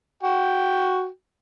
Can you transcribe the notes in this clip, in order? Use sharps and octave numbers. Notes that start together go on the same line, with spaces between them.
F#4 G5